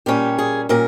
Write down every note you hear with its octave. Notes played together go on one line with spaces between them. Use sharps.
A#2 G3 C#4 G4
G#4
A#2 G3 C#4 A#4